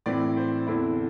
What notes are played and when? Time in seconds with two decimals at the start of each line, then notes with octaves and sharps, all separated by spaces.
0.06 A2 E3 C4 E4 D5
0.37 C5
0.67 E2 D3 C4 E4